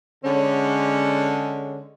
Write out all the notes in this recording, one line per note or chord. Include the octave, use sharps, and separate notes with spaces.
D3 G#3 C#4